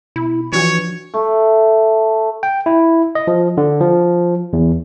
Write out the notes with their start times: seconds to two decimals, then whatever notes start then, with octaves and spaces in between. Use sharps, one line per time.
0.16 B2 E4 B5
0.53 E3 F3 D4 F#4 C#5
1.14 A3
2.43 G5
2.66 E4
3.15 D#5
3.27 F3
3.57 D3
3.81 F3
4.53 E2